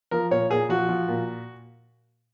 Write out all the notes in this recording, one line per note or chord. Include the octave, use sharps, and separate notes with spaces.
F3 A#4
A#2 C#5
A#2 G#4
F3 F#4
F3
A#2